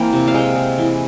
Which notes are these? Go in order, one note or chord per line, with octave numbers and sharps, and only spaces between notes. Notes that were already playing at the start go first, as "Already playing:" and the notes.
Already playing: E3 A#3 C4 G5
C3
F5
G#3 G5
G#3
E3